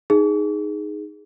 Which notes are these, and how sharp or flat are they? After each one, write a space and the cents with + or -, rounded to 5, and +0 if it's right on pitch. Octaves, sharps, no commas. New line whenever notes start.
D#4 +0 G#4 +0